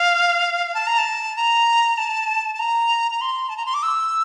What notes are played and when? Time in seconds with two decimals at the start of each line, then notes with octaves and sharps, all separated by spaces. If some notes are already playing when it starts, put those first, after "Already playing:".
Already playing: F5
0.75 A5
0.87 A#5
0.98 A5
1.36 A#5
1.98 A5
2.55 A5
2.59 A#5
3.11 A#5
3.21 C6
3.49 A5
3.57 A#5
3.66 C6
3.74 D6
3.83 E6